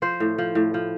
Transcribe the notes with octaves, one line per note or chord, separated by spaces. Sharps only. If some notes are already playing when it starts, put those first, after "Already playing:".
F3 C5
A2
F3
A2
F3